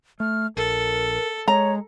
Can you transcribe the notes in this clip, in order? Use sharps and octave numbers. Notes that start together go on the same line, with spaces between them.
A3 F6
A#1 A4 A#4
G#3 C#5 A#5